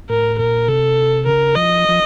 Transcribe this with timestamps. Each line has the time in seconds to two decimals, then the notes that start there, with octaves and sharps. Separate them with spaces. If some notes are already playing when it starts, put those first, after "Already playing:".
0.10 A2 A#4
0.39 A#2 A#4
0.68 C3 A4
1.26 C#3 A#4
1.56 F3 D#5
1.89 F3